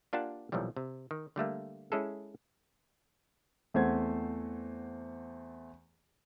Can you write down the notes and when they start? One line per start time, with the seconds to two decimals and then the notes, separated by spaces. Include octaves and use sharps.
0.13 A#3 D4 F4 G4 F#5 A5
0.52 B1 A#2 E3 F3 G3
0.76 C3
1.11 D#3
1.36 D3 G3 A3 A#3
1.92 G#3 C#4 E4 G#4 A4
3.74 E2 A3 C4 C5 F#5 G#6